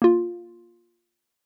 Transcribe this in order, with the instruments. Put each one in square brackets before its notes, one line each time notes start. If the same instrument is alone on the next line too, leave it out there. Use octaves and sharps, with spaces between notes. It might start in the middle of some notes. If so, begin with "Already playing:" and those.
[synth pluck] A#3 F4